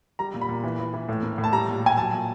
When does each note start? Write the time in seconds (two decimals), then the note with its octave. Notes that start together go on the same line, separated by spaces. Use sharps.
0.19 G3 A#5
0.34 A#2
0.41 B5
0.49 A#2
0.64 E3
0.79 E3
0.94 E3
1.09 A2
1.23 A#3
1.38 A2
1.44 A5
1.53 G3 A#5
1.68 A#2
1.83 G3 G#5
1.97 F#3 A5
2.13 A#2